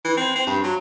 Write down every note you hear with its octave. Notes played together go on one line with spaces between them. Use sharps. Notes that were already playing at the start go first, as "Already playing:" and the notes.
E3
C4
C4
G2
F#3